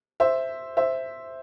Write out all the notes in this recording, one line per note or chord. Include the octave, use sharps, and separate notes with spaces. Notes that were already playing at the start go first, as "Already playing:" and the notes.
C5 E5
C5 E5